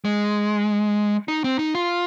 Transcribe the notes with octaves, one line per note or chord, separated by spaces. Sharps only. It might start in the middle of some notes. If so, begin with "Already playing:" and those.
G#3
D#4
C4
D#4
F4